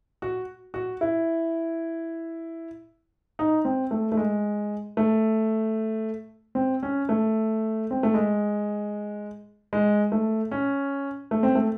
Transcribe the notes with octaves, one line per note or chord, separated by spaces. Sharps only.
F#4
F#4
E4
D#4
C4
A3
A3
G#3
A3
C4
C#4
A3
C4
A3
G#3
G#3
A3
C#4
A3
C4
A3